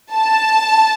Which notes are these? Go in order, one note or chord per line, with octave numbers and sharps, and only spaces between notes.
A5